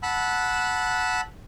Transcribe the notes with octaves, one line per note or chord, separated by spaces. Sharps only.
F#5 A5 B5 E6 F#6